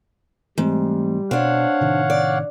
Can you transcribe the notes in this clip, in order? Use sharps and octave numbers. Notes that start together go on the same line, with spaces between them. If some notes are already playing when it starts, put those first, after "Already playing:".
G#2 E3 G3 A3 C4
B2 C4 D4 C#5 F5 F#5
A2 C3 D#3
D5